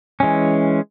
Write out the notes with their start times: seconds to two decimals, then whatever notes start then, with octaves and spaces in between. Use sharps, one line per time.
0.20 E3 G#3 C#4